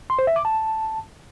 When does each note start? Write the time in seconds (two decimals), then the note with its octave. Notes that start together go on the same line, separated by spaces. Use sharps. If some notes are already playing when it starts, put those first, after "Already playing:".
0.10 C6
0.19 C5
0.27 E5
0.36 D6
0.45 A5